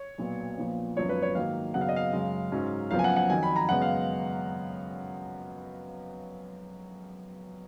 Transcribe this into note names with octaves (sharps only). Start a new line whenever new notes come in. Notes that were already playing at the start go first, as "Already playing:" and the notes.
Already playing: C#5
B1 A#2 F#3 B3
A#1 A#2 F3 B3
G#1 F#2 F3 B3 C#5
B4
C#5
G#2 D#3 F#3 A#3 F5
F#2 C#3 F#3 B3 F#5
F5
D#5
F5
F#2 C#3 G#3
G#2 F#3 C#4
F#1 F#2 F3 B3 F5
G#5
F#5
F#5
F2 D#3 F#3 G#5
B5
A#5
F#2 C#3 G#3 B3 F#5
F5